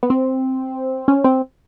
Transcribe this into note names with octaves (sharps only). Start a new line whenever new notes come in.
B3
C4
C#4
C4